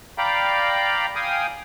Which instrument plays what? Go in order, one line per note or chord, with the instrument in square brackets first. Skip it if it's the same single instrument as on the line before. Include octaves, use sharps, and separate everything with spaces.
[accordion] D5 F5 G5 A#5 B5
F5 G5 G#5 D#6